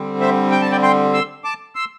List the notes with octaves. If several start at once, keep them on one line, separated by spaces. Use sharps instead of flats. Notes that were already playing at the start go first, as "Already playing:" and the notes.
Already playing: D3 G3 C4
C5 E5
G5
A5
D5 G5
G5 C6
C6 E6
A5 D6
C6 E6